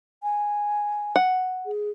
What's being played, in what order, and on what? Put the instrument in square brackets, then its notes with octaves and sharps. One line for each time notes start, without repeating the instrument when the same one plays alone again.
[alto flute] G#5
[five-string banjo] F#5
[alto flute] G#4